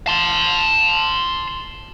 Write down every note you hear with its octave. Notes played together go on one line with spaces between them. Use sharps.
A5 C6